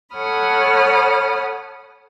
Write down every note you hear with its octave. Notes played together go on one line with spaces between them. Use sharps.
A4 C#5 F#5 B5 D#6 F6